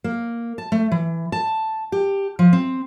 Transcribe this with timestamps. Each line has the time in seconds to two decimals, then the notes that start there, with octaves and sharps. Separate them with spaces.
0.04 A#3
0.58 A5
0.72 A3
0.91 E3
1.32 A5
1.92 G4
2.39 F3
2.53 C4